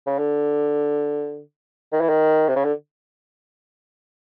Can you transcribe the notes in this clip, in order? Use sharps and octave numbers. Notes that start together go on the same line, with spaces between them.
C#3
D3
D#3
E3
D#3
C3
C#3
D3